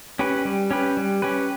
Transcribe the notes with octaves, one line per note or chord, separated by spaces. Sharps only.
C#4 G4 B4
G3
C#4 G4 B4
G3
C#4 G4 B4